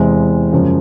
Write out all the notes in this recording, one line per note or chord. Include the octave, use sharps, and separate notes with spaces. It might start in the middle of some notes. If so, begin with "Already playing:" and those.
Already playing: E2 C3 E3 G#3 C4
F#2 C#3 F3 G#3